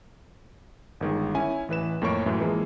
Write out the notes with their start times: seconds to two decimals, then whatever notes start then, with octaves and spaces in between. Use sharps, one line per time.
1.01 G1 D#3 G#3
1.35 C#4 E4 G#5
1.69 A1 E3 B4 E7
2.02 F2 A2 A#3 C#5 C#6 D7
2.26 F#2 A2 E3
2.41 E3 F3 G#3 A#3